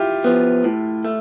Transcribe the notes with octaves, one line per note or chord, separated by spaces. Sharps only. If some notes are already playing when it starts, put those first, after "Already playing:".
Already playing: E4 F4 G4
F3 B3
A2
A3